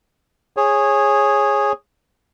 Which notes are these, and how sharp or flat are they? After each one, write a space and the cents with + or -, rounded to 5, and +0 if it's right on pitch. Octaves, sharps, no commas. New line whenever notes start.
G#4 -5 C#5 -15